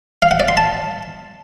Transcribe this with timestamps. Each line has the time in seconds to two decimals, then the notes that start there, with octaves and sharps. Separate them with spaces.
0.22 F5
0.31 F#5
0.40 D5
0.48 C6
0.57 A5